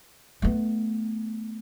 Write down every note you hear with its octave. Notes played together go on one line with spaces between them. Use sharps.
A3 B3